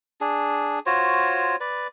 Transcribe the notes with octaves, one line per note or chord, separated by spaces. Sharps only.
D4 G#4
F4 F#4 C5 C#5
B4 D5